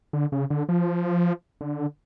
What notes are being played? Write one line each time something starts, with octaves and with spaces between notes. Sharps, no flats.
D3
C#3
D3
F3
D3